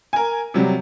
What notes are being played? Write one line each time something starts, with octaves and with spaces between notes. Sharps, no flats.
A#4 G#5
C3 F#3 G3 G4